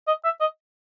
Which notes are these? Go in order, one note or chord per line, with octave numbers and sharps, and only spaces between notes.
D#5
E5
D#5